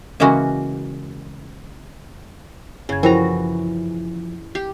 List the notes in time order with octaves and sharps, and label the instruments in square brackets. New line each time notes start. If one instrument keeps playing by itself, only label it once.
[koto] C#3 E3 G#3 A#3 C#4 F#4
[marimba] F#2 G#6 [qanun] C#3
[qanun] E3 F#4 A#5 [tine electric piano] F3 [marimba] A#4 C5 G5
[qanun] G4